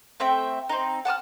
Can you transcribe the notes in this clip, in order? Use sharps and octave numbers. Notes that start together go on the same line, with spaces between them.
A3 C4 E5 G5
C4 D#4
F#5 A5 D#6 F6